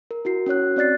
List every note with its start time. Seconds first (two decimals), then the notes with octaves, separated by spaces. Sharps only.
0.11 A#4
0.25 E4 F#4 C7
0.46 C#4 F#4 C#5 F#6
0.76 C4 C#4 D5 F#6 A6 C7